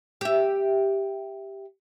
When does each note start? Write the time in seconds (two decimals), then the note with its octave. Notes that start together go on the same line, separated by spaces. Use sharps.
0.21 G4 E5